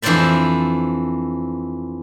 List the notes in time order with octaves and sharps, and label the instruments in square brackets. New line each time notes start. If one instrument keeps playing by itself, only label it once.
[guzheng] F2 E3 D4 C5 D5 E5